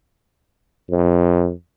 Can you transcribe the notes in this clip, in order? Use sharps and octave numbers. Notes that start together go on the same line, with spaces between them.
F2